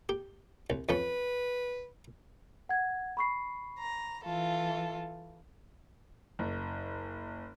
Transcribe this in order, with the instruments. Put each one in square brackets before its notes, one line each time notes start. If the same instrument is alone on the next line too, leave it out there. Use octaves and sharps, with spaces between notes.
[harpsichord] G4
C2
[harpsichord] F2 F3 C#4 [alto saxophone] B4
[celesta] F#5 G#6
B5 C#6 C7
[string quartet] A#5
E3 F4 A4
[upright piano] F#1